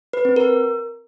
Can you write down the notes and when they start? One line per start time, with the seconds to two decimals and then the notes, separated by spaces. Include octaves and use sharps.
0.13 B4
0.25 C4
0.36 A#4